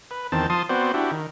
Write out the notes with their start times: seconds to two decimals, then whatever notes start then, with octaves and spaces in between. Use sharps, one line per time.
0.11 B4
0.32 E2 D#3 C4 A5
0.50 F3 A5 C6 D#6
0.69 B3 C4 F#4 C5 D5
0.94 D4 E4 F#4 G4
1.11 D#3